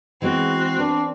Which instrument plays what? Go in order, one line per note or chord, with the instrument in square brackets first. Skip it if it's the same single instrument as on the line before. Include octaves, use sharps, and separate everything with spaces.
[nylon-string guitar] E3 G#3 B3 [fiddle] C4 [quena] F#4
[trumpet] D4 [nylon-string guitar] B4